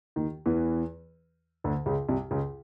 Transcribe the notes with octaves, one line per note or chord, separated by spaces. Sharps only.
D#2 D#3
E2 E3
D2 D3
C#2 C#3
C2 C3
C#2 C#3